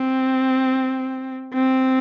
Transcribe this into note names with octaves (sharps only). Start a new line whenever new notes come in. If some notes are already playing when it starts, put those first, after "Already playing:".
Already playing: C4
C4